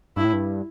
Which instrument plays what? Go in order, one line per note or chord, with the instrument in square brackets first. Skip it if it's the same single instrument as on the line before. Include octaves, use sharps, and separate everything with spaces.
[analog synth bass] G2 [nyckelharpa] E4
[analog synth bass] A2
G2